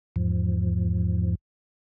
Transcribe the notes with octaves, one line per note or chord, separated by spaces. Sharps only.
E2 G#2 F3